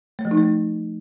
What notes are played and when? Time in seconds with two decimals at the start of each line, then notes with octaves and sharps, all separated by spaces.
0.19 A3
0.25 F3
0.31 D#4
0.37 A3